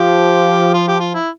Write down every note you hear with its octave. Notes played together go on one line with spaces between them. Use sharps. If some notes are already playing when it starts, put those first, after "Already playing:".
Already playing: F3 G4
F4
G4
F4
E4